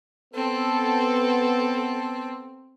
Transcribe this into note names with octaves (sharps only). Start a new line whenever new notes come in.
B3 C4 A4